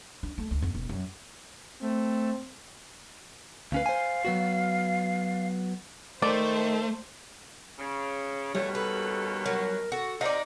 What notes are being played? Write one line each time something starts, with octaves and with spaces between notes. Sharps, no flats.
D4
A3
D2
F2
E1
F#2
A3 C4
D2 C#4 B4 F5
C5 G#5
F#3 B3 F#4
D#3 A3 C5 D5
C#3
D#2 B2 G3 A3 C#4 C#5
A4 B4
F#3 A#4
F#4 A4
C3 D#4 D5 F5